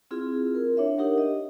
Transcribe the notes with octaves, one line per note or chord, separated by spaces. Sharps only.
C4 E4 F4 G#4
A#4
D4 C#5 E5
D4 D#4 G4 A#4 F#5
D#5